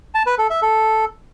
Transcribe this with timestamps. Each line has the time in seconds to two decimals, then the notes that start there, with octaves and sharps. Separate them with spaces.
0.14 A5
0.26 B4
0.38 A4
0.50 E5
0.62 A4